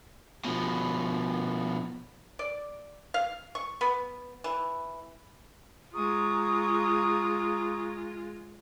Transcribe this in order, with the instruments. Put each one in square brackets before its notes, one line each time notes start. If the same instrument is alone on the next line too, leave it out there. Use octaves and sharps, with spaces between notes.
[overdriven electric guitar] B2 F3
[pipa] D5
F5
C#6
B3
E3
[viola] G#3 F4 [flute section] A#5 C#6 D#6